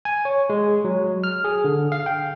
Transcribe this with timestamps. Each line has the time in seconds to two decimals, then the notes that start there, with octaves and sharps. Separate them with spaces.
0.05 G#5
0.25 C#5
0.50 G#3
0.85 F#3
1.24 F6
1.44 G#4
1.64 D3
1.92 F5
2.06 G5